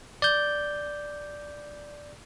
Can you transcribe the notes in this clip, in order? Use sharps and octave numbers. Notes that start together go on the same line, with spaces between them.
D5 G6